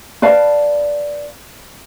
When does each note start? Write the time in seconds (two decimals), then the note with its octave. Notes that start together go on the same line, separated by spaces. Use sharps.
0.22 B4 D5 F5 A5